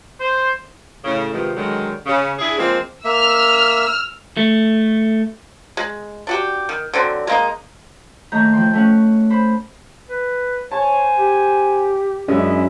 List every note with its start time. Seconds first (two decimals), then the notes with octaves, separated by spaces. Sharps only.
0.21 C5
1.04 A2 C#3
1.33 C3 D#3 F3 G#3 B3
1.57 D3 D#3 F#3 G#3
2.06 C#3
2.39 D4 E4 G#4
2.58 F3 G#3 A#3 C4
3.04 A#3 E5 E6 F6
4.37 A3
5.77 G#3
6.27 D4 F#4 G4
6.69 D#3
6.94 D3 F#3 C4
7.27 G#3 A#3 D#4
8.32 D#2 A3 D#4 A#5 G6
8.53 F3 G5 C6
8.73 A3 C#4 F#5
9.30 C5 B5
10.10 B4
10.72 C5 C#5 G#5 A5
11.17 G4
12.28 F#2 G#3 C#4 D4 E4 D#5